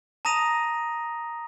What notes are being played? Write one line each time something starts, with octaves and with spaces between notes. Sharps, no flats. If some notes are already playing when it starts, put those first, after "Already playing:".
A5 A#5 D#6 A#6 D#7 F7